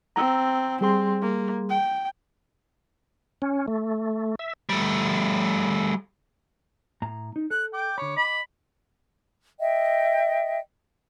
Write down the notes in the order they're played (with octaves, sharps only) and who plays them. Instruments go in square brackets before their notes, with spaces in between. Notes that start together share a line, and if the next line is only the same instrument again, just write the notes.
[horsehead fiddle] C4 [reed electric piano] A#5 E6
[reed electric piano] G3 G#4 C6 [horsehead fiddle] C4
[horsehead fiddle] A#3
G5
[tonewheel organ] C#4
A3
E5
[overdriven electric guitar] G3 A3
[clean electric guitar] A2 A#5
D#4
[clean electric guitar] A4 [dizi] F#6
[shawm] G5 [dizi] D6
[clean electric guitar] D3 B5 [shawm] C#5
[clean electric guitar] D#5 [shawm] B5
[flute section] D#5 E5 G5